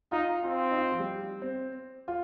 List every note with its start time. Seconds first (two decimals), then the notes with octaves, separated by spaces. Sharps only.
0.12 D#4 F4
0.44 C4 F4
0.71 D#4
0.77 F4
0.92 F3
0.99 G3
1.42 C4
2.08 F4